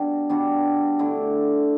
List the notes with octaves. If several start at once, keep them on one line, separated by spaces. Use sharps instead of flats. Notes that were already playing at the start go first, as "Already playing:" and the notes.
Already playing: B2 G3 D4 F#4
B2 G3 D4 F#4
D3 A3 E4